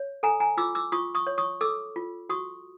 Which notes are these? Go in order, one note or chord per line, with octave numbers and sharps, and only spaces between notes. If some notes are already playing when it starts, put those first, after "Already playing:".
Already playing: C#5
A4 G#5 A#5
G#5 A#5
F4 D6 E6
D6 E6
F4 C#6 D#6
C#6 D#6
C#5
C#6 D#6
A4 D6 E6
F4
F#4 C#6 D#6